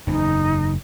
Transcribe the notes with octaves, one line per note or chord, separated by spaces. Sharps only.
F#1 E2 D#4